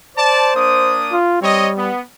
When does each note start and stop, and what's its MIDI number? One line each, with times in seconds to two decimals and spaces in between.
0.17 0.98 72
0.17 0.54 74
0.17 0.54 81
0.55 1.16 58
0.55 1.16 62
0.55 1.16 87
1.12 1.38 65
1.42 1.90 55
1.42 1.69 60
1.42 1.69 73
1.42 1.69 75
1.76 2.02 59